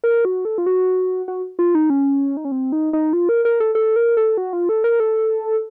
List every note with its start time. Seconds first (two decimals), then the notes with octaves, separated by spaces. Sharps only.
0.04 A#4
0.25 F#4
0.45 A4
0.58 F4
0.66 F#4
1.28 F#4
1.59 F4
1.75 D#4
1.90 C#4
2.37 D#4
2.45 C#4
2.52 C4
2.72 D#4
2.93 D#4
3.13 F4
3.29 A#4
3.45 A#4
3.60 A4
3.75 A4
3.96 A#4
4.17 A4
4.37 F#4
4.53 F4
4.69 A4
4.84 A#4
5.00 A4